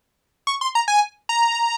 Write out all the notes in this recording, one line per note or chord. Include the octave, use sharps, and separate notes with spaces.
C#6
C6
A#5
G#5
A#5